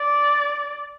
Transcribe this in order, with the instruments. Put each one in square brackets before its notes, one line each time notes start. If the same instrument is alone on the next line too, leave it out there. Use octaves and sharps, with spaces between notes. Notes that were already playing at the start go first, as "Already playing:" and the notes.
Already playing: [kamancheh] D5